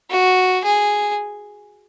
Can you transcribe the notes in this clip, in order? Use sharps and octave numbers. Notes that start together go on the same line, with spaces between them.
F#4
G#4